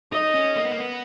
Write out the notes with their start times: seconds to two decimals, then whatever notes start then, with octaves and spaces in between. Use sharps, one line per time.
0.12 D#4 D#5
0.35 C#4
0.56 A#3
0.65 B3
0.71 A#3
0.80 B3